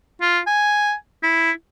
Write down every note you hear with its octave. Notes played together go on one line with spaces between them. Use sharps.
F4
G#5
E4